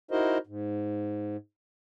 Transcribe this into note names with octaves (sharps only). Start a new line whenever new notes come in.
D#4 E4 F#4 A#4 C5 D#5
G#2